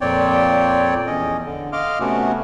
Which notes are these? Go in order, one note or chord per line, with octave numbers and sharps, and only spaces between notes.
F2 A#2 C4 C#5 D5 G5
E2 C#4 D#5
D3
D#5 F5 C6 D6 F6
C3 A3 B3 C#4 F#4